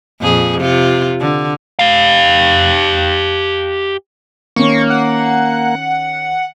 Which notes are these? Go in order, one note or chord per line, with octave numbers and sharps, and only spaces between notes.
F2 A#2 G#4
C3 F4
D3
G4 F5
D#3 A#3 C#4 C#6
F#5